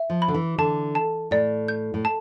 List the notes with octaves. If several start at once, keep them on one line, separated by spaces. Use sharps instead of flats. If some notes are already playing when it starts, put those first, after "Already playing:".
Already playing: E5
F3
B5
D3
E3
D3 A5
A5
A2 D5
G6
A2
A5